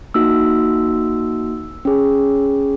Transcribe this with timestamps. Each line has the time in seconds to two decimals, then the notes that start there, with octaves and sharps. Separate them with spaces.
0.14 A#3 D#4 F#4 E6
1.85 C#4 G#4